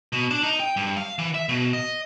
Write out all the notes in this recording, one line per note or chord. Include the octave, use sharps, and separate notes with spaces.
B2
D4
D#4
G5
G2
F5
E3
E5
B2
D#5